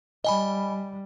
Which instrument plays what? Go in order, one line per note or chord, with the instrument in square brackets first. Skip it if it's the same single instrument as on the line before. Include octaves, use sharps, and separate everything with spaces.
[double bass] G3 [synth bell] D#5 G#5 B5